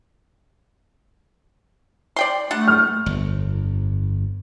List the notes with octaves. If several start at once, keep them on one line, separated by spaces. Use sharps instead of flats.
D5 G5 C6
G3 A3 D4 F#5
F6
G1 F2